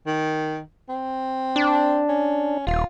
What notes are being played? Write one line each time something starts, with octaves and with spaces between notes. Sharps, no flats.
D#3
C4
D4
C#4
D#1 F4